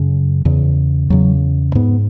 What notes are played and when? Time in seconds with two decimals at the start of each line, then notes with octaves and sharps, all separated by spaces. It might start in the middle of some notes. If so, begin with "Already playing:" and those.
Already playing: F#2 C#3
0.45 E2 C#3
1.10 E2 C#3 F#3
1.75 G#2 B3